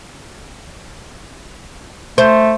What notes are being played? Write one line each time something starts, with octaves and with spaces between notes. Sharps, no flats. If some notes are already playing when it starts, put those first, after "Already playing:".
A3 C5